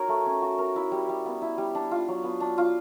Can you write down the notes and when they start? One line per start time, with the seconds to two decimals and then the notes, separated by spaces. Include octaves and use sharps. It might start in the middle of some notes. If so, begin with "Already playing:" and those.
Already playing: D#4 F#4 A#4 C#5
0.09 A3
0.26 C#4
0.42 F#4
0.58 A#4
0.76 E4
0.92 G3
1.09 G3
1.26 B3
1.42 E4
1.58 G3
1.75 D4
1.91 F4
2.08 F#3
2.24 B3
2.40 D4
2.58 F4